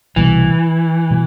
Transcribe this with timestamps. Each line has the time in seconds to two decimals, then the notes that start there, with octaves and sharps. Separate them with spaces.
0.16 C2 B2 E3 G3 B3
1.10 B2 G3